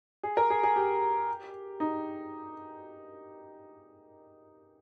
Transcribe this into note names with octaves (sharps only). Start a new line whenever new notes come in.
G#4
A#4
G#4
G#4
G4
D#4